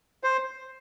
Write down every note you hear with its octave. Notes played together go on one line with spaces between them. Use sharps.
C5